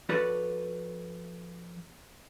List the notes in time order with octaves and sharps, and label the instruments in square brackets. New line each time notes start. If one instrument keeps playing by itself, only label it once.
[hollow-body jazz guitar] F3 F#4 A4 B4 C#5 D5